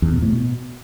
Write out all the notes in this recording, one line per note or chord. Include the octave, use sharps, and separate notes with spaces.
E2
B2
A2
B2